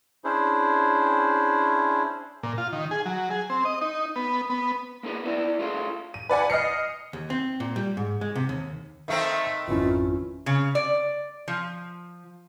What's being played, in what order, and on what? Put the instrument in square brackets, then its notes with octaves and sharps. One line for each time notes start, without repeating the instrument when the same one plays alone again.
[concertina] C#4 D4 E4 G#4 C5
[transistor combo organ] A#2
F4
D#3
G#4
F#3
G#4
C4
D#5
D#4
B3
B3
[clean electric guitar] A#3 B3 D#4 G#4 B4
B3 E4 B4 D5 E5
A3 F4 G#4 A4 F5
[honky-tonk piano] D#7
B4 D5 F#5 G#5
D#5 F6 C7 C#7
[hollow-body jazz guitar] D#2
C4
A#2
G3
G#2
G#3
C3
D#2
[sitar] D#3 A3 C4 [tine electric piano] E5 F5
[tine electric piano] G#1 F2 [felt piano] C#4 E4 B4 [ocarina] F4
[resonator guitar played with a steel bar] C#3
D5
F3